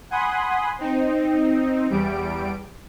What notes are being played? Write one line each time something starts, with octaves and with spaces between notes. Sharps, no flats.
F#5 G#5 B5 C6 D#6 F#6
C4 D#4
E2 G3 D7